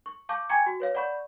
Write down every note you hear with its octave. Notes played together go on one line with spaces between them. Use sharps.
C#6
F5 A5 C#6 D6 G6
G5 G#5 A#5 C#6 G#6 C#7
F#4
B4 C#5 F5
D5 F#5 B5 C#6 G6